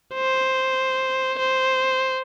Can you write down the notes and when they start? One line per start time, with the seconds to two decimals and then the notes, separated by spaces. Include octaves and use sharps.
0.15 C5
1.39 C5